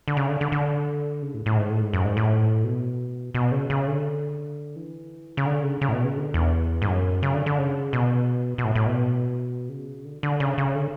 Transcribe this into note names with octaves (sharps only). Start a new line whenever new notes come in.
D3
C#3
D3
D3
D3
C#3
A2
A2
G#2
A2
G#2
F#2
G#2
A2
B2
B2
C#3
C#3
D3
E3
C#3
D3
C#3
C#3
A2
B2
C#3
D3
E2
G#2
F#2
C#3
D3
D3
C#3
B2
B2
A2
A2
B2
C#3
D3
D3
C#3
C#3
D3